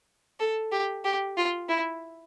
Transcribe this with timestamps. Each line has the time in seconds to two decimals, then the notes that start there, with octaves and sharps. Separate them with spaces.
0.40 A4
0.72 G4
1.05 G4
1.37 F4
1.69 E4